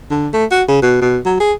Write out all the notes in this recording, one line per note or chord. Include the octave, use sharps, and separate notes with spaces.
D3
A3
F#4
C#3
B2
B2
F#3
G#4